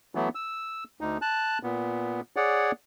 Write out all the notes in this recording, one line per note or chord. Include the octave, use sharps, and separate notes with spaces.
E3 F#3 A3 B3
E6
D2 D#4
A5 F#6
A#2 B3
G#4 C#5 D5 F#5